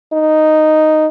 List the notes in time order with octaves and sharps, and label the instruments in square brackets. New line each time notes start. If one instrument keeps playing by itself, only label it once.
[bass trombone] D#4